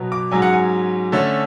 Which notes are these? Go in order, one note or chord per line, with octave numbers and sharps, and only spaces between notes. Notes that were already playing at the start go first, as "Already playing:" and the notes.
Already playing: B2 F#3 B3
D6
G#2 F#3 C#4 G#5
F#5
G#5
D3 A3 C#4